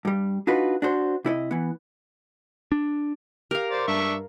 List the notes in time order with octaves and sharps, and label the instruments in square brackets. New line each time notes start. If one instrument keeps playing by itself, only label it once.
[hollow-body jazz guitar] G2 G3
D4 D#4 F4 F#4 B4
D4 F#4 C5
C3 E4 C#5 D#5
E3 B3
[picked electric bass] D4
[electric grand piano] G4 [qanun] A#4 F5
[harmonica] C5 D5
[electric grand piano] G2 [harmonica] D4 E5 C#6